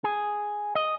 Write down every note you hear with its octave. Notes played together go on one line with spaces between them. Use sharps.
G#4
D#5